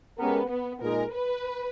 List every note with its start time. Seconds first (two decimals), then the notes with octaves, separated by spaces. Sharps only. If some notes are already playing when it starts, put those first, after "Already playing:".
0.19 G#3 B3 C#4 G4 A#4
0.50 B3
0.82 A#2 G#3 D#4 G#4 A#4
1.13 B4